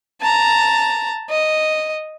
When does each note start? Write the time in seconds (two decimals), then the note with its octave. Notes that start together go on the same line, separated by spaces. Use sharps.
0.21 A5 A#5
1.30 D#5